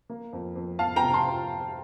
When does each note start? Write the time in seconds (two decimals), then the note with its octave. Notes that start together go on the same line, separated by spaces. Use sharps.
0.09 A#3
0.33 F2
0.56 F2
0.79 F2 F5 A5
0.96 G5 A#5
1.02 C3
1.13 A5 C6
1.25 F3